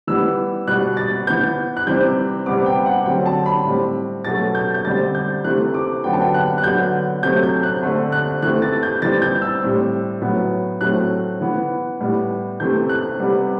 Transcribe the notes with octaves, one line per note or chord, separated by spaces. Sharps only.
E3 G3 B3 E6
B2 G3 B3 F#6
A6
E3 B3 G6
F#6
C3 E3 G3 C4 G6
C3 G3 B3 D6
G5
F#5
D3 F#3 C4 G5
A5
B5
A2 G3 C4
B2 F#3 A3 A6
G6
G6
D3 G3 C4 A6
G6
C3 E3 A3 C4 F#6
D6
D3 F#3 B3 G5
A5
G5
F#6
F#6
D3 F#3 B3 G6
C3 F#3 A3 C4 G6
G6
F#6
D3 A3 C4
F#6
E3 A3 C4 F#6
A6
G6
E3 G3 C4 A6
G6
E6
A2 G3 C4
A2 F#3 B3
A2 F#3 A3 C4 F#6
E3 B3
A2 G3 B3
C3 E3 A3 C4 G6
F#6
C3 G3 B3